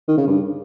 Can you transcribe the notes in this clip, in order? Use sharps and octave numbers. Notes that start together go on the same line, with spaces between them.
D#3
C#3
G2